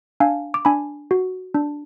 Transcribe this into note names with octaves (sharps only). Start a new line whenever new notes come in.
D4 F5 G#5
D6
D4 G#5 B5
F#4
D4